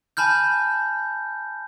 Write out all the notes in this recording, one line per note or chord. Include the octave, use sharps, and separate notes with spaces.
G#5 A5 B5 F6 G6